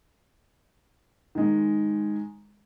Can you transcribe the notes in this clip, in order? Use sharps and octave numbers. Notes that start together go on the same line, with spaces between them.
D#3 G#3